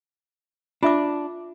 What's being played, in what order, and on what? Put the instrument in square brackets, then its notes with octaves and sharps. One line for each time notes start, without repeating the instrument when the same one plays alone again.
[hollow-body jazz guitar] D4 [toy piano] F4 E5 D6